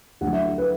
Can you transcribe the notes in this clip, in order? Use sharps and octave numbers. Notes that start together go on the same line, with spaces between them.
D2 D3 F#3 F#5
E5
B4